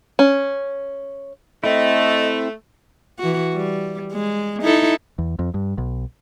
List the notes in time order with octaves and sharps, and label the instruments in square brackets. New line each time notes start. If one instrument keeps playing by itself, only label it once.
[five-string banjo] C#4
[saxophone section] A3 [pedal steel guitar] C4 E4 [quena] D#5
[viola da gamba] E3 F#4
G3
G#3
D#4 E4 A4
[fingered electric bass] E2
F2
G2
B1